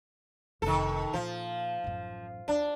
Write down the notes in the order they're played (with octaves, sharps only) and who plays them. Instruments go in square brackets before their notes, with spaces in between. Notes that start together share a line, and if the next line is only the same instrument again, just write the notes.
[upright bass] F1 [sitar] D#3 A4
[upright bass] A#2 [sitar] F3
[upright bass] A1 F#2
[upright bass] D#2 [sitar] D4